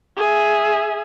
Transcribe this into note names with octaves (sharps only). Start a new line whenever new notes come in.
G#4 E5